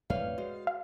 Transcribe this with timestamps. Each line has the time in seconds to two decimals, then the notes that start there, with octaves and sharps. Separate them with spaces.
0.10 F2 A2 B4 C#5 D5 F5
0.38 G#3 F#4 D#5
0.67 F5